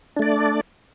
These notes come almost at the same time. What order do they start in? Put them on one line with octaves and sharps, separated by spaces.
D4 A3 D5